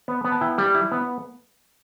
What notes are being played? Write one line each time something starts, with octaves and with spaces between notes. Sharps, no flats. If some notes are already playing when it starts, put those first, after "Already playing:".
B3
B3
A5
E4 G5
G3
E4
B3